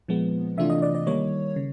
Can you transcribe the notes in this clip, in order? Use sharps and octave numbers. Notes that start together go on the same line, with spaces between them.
A#2 F3 G#3 B3
C3 E3 A3 D4 F4 E5
D#5
D5
D5
D#3 G3 A#3 C#5
C#3